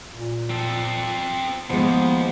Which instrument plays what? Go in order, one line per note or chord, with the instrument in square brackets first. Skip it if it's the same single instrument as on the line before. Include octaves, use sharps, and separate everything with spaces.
[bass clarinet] A#2
[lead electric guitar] C4 A4
[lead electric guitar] D#2 [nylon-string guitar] F3 G#3 [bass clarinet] B3